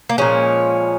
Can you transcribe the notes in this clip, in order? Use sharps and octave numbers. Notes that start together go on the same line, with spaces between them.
A#3
A#2 F3 G#3 C#4